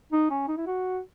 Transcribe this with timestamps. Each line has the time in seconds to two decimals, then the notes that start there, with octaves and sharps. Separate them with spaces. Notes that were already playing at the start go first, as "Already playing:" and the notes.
0.12 D#4
0.30 C#4
0.48 D#4
0.57 E4
0.66 F#4